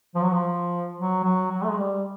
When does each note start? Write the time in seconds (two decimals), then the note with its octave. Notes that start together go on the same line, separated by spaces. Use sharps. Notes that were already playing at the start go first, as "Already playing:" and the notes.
0.15 F3
0.24 F#3
0.32 F3
0.97 F#3
1.24 F#3
1.51 F#3
1.63 A3
1.70 G#3
1.79 G3